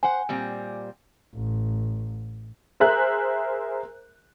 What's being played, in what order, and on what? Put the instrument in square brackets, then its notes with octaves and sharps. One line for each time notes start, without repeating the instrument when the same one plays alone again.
[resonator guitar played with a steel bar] C5 F#5 [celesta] G#5
[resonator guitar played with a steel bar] A#2 G3 C4
[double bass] A1
[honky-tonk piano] G#4 A#4 C5 E5 A#5 F#6